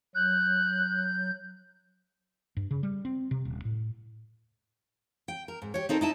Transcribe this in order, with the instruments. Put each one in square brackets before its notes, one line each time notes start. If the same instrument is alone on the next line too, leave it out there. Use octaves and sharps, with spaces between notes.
[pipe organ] F#3 G6 [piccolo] F#6
[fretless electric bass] G2
C#3
G3
C4
C3
D#1
A2
[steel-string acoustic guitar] G5
A#4
G#2
G4 C#5
C4 D#4 A4 A#4
D#4 E4 A5